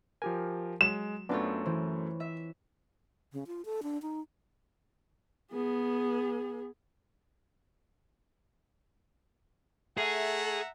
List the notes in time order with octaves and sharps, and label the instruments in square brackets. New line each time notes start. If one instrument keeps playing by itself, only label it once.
[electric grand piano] F3 G4 A#4 [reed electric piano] G#5
[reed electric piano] F#3 [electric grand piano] G#3 [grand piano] E7
[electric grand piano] F#2 A3 [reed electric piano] B3 D4 [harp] C4 F4 C#5
[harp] E3 [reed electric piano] C5
[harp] E5
[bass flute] C#3
F4
A4
D4
D#4
[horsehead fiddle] B3 G#4
[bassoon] A3 [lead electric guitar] G#4 [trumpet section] E5 F#5 A#5